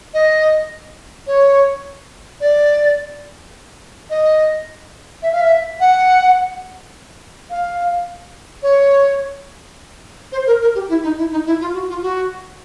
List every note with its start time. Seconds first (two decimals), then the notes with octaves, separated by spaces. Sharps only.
0.14 D#5
1.27 C#5
2.41 D5
4.10 D#5
5.22 E5
5.32 F5
5.41 E5
5.80 F#5
7.50 F5
8.62 C#5
10.32 C5
10.46 A#4
10.61 A#4
10.75 G4
10.89 E4
11.03 D#4
11.18 E4
11.31 D#4
11.46 E4
11.61 F4
11.74 F#4
11.89 F4
12.02 F#4